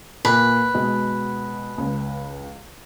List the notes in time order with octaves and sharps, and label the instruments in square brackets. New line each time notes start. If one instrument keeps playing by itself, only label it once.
[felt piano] A#2 [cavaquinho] B4
[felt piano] B2 G#3
C#2